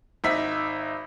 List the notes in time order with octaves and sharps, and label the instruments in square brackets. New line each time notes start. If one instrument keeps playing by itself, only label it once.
[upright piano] G#1 D#4 E5 E6 B6